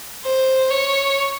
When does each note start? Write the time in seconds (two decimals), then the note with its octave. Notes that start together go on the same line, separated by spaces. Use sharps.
0.25 C5
0.71 C#5